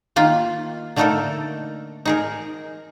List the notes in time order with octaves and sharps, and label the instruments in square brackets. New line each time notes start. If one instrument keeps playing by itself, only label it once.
[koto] D#3 A#3 F4
D3 A3 A#3 D#4 A4 A#4
D#4 G#4 A#4